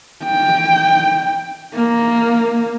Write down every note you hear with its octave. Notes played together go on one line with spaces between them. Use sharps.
G5
A#3